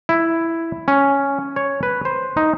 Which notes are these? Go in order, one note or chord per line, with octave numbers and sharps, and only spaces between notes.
E4
C#4
C#5
B4
C5
D#4